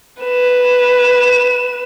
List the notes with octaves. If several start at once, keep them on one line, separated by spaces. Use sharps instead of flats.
B4 E7